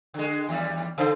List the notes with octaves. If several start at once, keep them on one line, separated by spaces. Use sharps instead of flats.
D3 G#3
D#2 G3
C#3 A4 C5